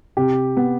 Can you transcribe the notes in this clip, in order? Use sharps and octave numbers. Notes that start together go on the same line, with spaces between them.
C3 G4
B3